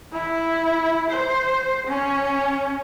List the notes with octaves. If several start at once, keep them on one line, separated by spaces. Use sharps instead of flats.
E4
C5
C#4